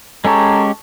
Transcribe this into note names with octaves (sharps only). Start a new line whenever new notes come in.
G#3 C#4 G4 A4 A5 A#5 C#6